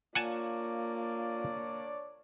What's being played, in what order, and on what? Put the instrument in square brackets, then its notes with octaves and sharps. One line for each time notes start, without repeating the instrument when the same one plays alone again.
[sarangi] A#3 [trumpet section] D4 C#5 D5 [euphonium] F4 [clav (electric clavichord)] F#5 G#5 A5